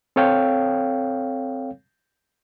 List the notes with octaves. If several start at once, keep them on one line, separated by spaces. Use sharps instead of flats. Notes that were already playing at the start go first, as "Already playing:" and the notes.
C4 A4 C#5 F5 G5